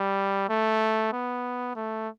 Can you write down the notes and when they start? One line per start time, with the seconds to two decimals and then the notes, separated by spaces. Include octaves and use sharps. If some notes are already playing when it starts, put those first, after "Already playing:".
Already playing: G3
0.49 A3
1.13 B3
1.76 A3